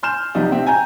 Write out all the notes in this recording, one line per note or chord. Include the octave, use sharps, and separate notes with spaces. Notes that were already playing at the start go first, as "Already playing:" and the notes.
G#5 C6 F6 G6 E7
B1 C3 F3 D#4 D5
C3 C4 E5
G5 G#5 A#5 G6